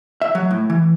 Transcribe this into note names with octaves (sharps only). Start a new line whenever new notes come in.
E5
F#3
A2
E3